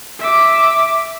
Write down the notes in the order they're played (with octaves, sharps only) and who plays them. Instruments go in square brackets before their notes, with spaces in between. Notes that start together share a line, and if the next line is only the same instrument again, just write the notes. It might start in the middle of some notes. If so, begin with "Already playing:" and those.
[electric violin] E5 D6